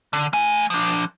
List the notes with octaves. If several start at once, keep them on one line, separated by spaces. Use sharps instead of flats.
D3
A3 G#5
F3 D4